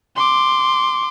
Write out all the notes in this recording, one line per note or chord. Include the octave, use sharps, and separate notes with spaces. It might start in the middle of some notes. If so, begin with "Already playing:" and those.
C6 D6